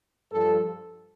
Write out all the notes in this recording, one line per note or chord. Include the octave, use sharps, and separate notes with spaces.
G2 F3 A4